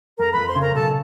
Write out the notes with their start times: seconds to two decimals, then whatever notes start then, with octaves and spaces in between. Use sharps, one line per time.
0.19 F2 A#4 A#5
0.33 F2 B4 B5
0.47 C5 C6
0.56 C#3
0.61 A#4 A#5
0.74 B1 A4 A5